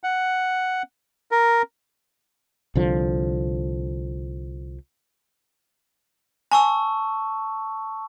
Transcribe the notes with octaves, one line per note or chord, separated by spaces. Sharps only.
F#5
A#4
C2 D3 F3
G#5 A5 C#6 E6